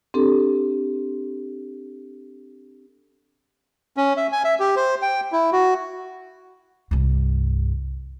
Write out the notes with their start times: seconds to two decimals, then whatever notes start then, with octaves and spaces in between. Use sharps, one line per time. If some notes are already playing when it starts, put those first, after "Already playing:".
0.14 C4 D4 G4 A4
3.97 C#4
4.17 E5
4.32 G#5
4.44 E5
4.60 G4
4.76 C5
5.02 G5
5.32 E4
5.53 F#4
6.91 C2 G2